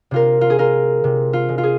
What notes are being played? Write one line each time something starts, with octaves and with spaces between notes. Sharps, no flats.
C3 F4 A#4
F4
G#4
G#3 F4 A#4
C3
F4
G#3
F4
G#4